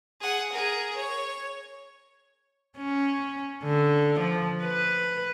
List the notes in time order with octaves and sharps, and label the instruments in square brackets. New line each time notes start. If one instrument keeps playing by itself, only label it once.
[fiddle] G#4 F#5
G#4 A#4
C#5
[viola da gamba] C#4
D3
F3
B4